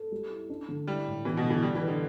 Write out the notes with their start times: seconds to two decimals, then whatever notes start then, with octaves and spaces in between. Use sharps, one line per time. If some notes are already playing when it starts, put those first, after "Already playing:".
Already playing: A4
0.12 G3
0.30 E4
0.50 D4
0.68 D3
0.87 G3 E4
1.06 A2
1.25 E3 B3
1.37 B2
1.44 D3
1.50 E3
1.62 G3 G4
1.75 E3
1.81 B4
1.88 D3